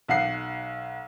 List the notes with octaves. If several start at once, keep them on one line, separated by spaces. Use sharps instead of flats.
B1 F#5 C7